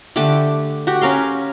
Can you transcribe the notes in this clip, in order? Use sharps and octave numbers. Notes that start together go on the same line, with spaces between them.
D3 A3 G4 D6
F#4 G4
C#4 A#4 F5 C6